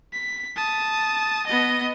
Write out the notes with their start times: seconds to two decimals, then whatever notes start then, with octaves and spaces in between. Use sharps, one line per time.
0.13 B6
0.56 A5 D#6
1.47 B3 D#5